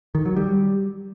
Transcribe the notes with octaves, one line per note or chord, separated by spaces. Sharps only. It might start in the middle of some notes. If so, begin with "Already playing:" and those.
D#3
F#3
G3